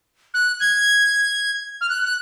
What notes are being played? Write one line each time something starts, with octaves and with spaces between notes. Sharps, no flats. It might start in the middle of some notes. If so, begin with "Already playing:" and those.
F#6
G#6
F6
F#6
F#6